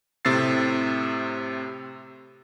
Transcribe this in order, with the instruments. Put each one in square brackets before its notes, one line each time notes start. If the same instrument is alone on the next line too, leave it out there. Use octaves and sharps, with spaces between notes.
[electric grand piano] A2 C3 C4 E6 A6 C7